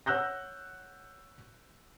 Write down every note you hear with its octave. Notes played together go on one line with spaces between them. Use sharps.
C#5 F#5 E6 F#6 G6 A#6